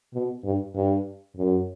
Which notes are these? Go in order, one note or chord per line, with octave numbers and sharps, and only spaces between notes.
B2
G2
G2
F#2